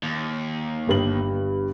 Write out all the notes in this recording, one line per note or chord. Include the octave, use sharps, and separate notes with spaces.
D#2
G1 G2 F#7